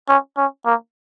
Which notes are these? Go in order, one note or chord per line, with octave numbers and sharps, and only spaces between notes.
C#4
C#4
A#3